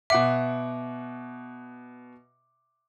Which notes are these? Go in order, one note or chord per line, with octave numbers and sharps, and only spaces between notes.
B2 E5 F#5 D6